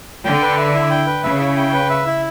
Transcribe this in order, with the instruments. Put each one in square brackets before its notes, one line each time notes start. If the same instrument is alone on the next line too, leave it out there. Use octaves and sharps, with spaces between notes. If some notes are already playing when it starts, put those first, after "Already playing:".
[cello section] D3 [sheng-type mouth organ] G5
[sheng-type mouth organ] B4
E5
E4
G5
B4
[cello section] C#3 [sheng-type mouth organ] E5
[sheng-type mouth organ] E4
G5
B4
E5
E4